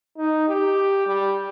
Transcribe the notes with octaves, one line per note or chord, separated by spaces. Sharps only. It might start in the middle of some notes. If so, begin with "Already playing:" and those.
D#4
G4
G3